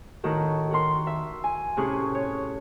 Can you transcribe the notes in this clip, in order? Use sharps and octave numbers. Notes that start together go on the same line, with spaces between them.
A2 D#3 F#4 A4
F#4 A#4 C6
E5
G#5
A2 C3 C#4 G#4 C#6 F#6
C#5